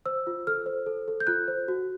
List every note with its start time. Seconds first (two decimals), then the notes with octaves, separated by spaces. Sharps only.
0.06 C5 E6
0.27 F4
0.47 A4 F6
0.66 C5
0.86 A4
1.08 A4
1.20 G6
1.27 F4 F#6
1.48 C5
1.68 F#4